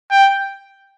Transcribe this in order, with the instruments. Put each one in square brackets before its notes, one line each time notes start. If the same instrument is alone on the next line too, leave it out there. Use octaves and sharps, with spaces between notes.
[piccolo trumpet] G5